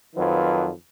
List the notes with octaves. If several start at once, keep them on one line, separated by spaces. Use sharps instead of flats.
F2 D#3 F3 F#3 B4